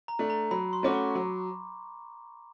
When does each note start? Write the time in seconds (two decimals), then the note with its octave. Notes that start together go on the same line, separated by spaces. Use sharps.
0.08 A#5
0.19 A3 D4
0.30 A#5
0.51 F#3 B5
0.73 C6
0.83 A3 C#4 F#4 D6
0.94 C#6
1.15 F#3